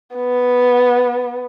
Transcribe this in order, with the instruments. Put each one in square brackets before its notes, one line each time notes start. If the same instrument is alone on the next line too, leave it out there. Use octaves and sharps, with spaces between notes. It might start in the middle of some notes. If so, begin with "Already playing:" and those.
[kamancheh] B3